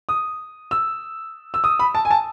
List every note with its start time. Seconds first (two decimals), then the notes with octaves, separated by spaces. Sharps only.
0.09 D#6
0.71 E6
1.54 E6
1.64 D#6
1.79 B5
1.95 A5
2.05 G#5
2.11 A5